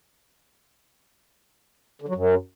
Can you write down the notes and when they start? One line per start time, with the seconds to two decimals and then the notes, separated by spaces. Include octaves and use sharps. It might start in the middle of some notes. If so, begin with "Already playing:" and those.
2.02 D3
2.08 F#3
2.15 F#2